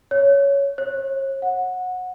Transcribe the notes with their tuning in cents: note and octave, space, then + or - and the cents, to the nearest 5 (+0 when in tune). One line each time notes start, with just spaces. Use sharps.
C#5 +10
C#5 -45
F#5 -15